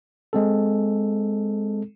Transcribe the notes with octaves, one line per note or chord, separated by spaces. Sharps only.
G#3 C4 A4